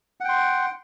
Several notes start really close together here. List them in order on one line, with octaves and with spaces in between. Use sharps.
F#5 G5 C6